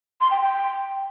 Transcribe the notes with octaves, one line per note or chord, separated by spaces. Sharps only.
C6
G5
G5